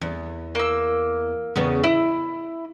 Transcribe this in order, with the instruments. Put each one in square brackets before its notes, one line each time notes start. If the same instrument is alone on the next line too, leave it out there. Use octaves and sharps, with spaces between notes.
[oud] E2
[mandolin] A#3 E6
[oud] E2 C#3 B3
[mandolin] E4 [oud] E5